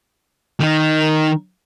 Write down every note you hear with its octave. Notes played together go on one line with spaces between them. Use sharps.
D#3 D#4